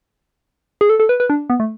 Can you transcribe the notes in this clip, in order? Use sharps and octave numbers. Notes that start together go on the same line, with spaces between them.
G#4
A4
A4
B4
B4
D4
B3
A3